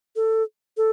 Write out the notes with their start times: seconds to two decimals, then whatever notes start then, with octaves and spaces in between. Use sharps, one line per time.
0.16 A4
0.77 A4